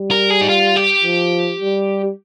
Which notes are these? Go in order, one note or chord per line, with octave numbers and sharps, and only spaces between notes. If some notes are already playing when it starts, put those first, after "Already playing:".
Already playing: G3
A#4
G#4
D#4
F4
G4
F3
G3